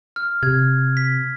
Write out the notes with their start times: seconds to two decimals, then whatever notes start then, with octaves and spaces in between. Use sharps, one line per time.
0.16 F6
0.43 C3 G#6
0.97 B6